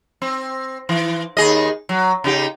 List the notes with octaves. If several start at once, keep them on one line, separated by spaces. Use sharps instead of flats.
C4
E3
D#2 G#4 D#5
F#3
C#3 D#4 G4